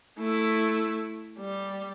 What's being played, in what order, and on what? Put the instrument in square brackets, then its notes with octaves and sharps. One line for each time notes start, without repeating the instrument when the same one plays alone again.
[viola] A3 E4
G3